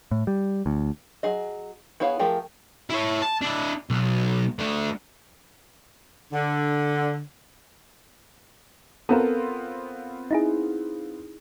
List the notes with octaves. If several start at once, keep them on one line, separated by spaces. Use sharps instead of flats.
A2
G3
D2
F#3 G#4 D#5
B3 E4 G#4 C#5 F5
F3 A3 G4 G#4 A#4
E4 C#5
A5
D4 E4
B1
A3 D4
D3
B3 C4 F4 A4 A#4
D#4 E4 G#4